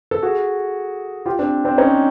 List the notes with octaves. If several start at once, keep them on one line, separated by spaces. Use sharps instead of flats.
A4
F#4 G#4
F4 G4
C4 D4
C4 D4
C#4 D#4